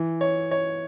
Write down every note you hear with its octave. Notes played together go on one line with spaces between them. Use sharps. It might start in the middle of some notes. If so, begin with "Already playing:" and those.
Already playing: E3
C#5
C#5